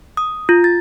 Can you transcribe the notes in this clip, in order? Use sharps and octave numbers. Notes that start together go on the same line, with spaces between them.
D#6
F4
A6